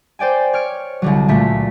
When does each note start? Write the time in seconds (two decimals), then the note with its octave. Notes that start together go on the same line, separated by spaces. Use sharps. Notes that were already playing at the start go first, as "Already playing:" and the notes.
0.19 C5 D5 G5 G#5
0.53 C#5 F6 D7
1.02 C2 D3 F#3
1.28 C#2 A#2 A3 B6